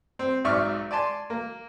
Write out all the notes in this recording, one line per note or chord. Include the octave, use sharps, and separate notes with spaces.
C4
B1 G#2 D5 E5 C#6 F6
D5 G#5 A5 C6
A#3